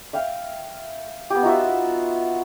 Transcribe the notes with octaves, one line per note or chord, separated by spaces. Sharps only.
E5 F5 G5
B3 G4
D#4 F4 F#4 E5